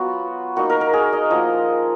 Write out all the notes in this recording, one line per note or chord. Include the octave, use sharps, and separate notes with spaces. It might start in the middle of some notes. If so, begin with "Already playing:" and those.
Already playing: F#3 B3 F4 F#4
A#3 D#4 F#4
A#4
A#4
G#4
D#5
F3 A#3 F4 D#5